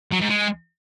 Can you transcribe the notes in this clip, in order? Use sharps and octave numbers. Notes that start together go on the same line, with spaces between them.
F#3
G#2
G#3